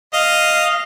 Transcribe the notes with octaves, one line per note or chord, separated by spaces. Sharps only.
D#5 F5